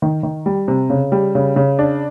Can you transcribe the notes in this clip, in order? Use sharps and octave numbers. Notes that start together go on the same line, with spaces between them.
D#3
D#3
G3
C3
C#3
G3
C#3
C#3
D4